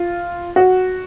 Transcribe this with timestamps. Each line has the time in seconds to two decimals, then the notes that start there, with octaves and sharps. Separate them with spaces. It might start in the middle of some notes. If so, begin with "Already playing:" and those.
Already playing: F4
0.56 F#4